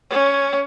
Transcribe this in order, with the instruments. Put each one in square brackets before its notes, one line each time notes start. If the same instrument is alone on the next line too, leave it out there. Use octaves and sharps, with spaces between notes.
[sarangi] C#4